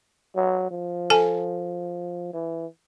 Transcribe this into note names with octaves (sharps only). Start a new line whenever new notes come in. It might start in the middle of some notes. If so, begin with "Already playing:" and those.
F#3
F3
A4 G#5 A5
E3